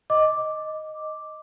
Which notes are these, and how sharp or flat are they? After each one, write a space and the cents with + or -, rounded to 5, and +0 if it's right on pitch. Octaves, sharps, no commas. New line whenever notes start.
D#5 +0 D6 +0